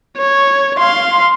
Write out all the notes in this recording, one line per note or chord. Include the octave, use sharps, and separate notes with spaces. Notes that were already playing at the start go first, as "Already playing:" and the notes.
C#5
F5 C6